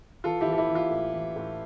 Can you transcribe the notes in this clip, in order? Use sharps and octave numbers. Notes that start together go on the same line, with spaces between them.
E3 F4 A4
E4 G4
E3
A4
E4 G4
E3
F4
A2
E3
A2